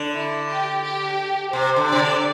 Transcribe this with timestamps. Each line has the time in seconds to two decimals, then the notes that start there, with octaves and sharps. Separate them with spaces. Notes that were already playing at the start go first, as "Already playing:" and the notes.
Already playing: D3
0.14 E4
0.49 G4
0.83 G4
1.53 C3 C5
1.76 D3
1.88 C3 D5
1.99 D3